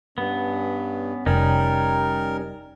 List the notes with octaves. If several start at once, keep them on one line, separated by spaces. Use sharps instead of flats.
G2 B3 C#4
F1 G3 C#4 D#4 A#4 G5